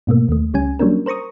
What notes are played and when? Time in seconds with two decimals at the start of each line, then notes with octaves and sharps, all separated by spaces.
0.07 G#2 B2 A3 A#3
0.29 D#2 A3
0.53 C#2 G3 C#4 G#5
0.79 F#3 G3 A#3 C#4 D4 A#4
1.06 A#4 C5 A#5 C#6 D#6